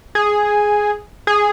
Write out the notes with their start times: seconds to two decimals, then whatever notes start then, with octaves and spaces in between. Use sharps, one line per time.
0.15 G#4
1.27 G#4